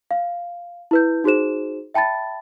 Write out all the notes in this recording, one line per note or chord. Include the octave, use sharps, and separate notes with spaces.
F5
E4 B4 G6
D#4 F#4 G#4 C5 E7
E5 G5 A5 B5 A6